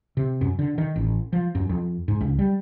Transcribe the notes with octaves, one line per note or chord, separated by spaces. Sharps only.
C3
F#2
D3
D#3
A1
F3
F#2
F2
G#2
C#2
G3